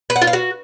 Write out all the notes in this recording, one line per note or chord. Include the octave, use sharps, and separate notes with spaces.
B4
F#5
F4
F5
F#4